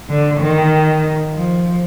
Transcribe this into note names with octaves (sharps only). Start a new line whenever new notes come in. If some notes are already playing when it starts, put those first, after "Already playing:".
D3
D#3
F3